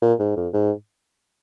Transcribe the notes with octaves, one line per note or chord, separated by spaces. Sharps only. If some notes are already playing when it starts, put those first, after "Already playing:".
A#2
G#2
F2
G#2